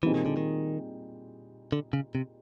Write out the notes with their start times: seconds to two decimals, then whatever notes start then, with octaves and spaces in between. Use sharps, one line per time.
0.02 A#2 E3 G3 C4 D#4 G#4
0.14 D#3
0.26 D3
0.37 D#3
1.72 D3
1.93 C#3
2.15 C3